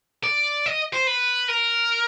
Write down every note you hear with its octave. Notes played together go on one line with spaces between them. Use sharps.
D5
D#5
C5
B4
A#4